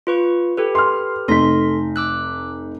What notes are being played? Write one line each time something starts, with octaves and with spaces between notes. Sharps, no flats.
F4 B4 C#6
G4 A4 B4
C6 F6
F1 D#4 A4 C6 A#6 B6
D6 E6 F#6